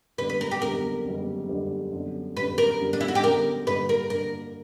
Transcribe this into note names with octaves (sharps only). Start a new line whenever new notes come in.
F#1 E2 D3 G3 B4
B4
A#4
G4
F#1 E2 D3 G3 A#4
F#1 E2 D3 G3
F#1 E2 D3 G3
F#2 D3 G3 B3
F#2 D3 G3 B3 B4
A#4
F#2 D3 G3 B3
D4
E4
F#4
G4
F#2 D3 G3 B3 A#4
G2 D3 A#3 B4
A#4
G2 D3 A#3 A#4